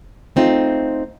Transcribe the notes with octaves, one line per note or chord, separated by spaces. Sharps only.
A3 C4 D#4 F4